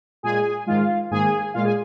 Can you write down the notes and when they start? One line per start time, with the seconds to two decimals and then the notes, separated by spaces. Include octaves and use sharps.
0.23 A#2 G#3 G#4 G#5
0.67 G#2 D#3 G#3 F4 F5
1.11 G#2 D#3 A#3 G#4 G#5
1.54 A#2 G#3 F4 F5
1.65 G#4 G#5